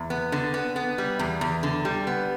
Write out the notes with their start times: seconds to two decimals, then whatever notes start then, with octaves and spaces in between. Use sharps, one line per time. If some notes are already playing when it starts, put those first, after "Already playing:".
Already playing: E2
0.10 B3
0.32 D3
0.54 B3
0.76 B3
0.98 G3
1.19 E2
1.41 E2
1.63 D3
1.85 G3
2.07 B3